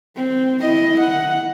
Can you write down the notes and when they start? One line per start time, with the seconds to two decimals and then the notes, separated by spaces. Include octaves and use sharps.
0.16 C4
0.61 E4 D#5
1.01 F#5